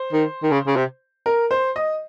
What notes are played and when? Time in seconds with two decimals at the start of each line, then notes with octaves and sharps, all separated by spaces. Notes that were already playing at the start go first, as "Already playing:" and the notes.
Already playing: C5
0.13 D#3
0.43 D#3
0.51 C#3
0.67 C#3
0.76 C3
1.26 A#4
1.51 C5
1.76 D#5